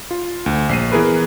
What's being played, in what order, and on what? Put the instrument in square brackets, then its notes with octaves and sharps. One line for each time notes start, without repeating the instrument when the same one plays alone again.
[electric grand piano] F4
D2
A#1 C7 D#7
E3 B3 G#4 A#4 B4